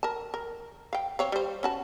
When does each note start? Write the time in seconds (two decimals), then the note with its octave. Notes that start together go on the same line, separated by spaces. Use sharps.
0.03 A#4 A5
0.34 A#4
0.93 F5 G5
1.19 C4 C#5 F5
1.32 G3 C5
1.63 C#4 F#4 A5